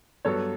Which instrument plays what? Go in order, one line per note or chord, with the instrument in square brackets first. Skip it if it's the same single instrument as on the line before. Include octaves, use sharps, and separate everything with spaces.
[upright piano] G2 F#3 B3 A4 C#5